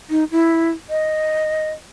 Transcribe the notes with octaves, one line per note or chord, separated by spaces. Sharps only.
D#4
E4
D#5